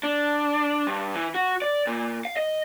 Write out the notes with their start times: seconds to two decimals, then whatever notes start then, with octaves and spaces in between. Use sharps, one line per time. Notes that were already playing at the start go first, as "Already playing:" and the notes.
0.03 D4
0.87 G2
1.15 E3
1.34 F#4
1.62 D5
1.87 A#2
2.25 F5
2.37 D#5